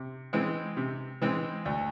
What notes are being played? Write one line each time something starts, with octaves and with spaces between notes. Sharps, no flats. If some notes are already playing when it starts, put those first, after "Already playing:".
Already playing: C3
E3 G#3 C4
C3
E3 G#3 C4
D2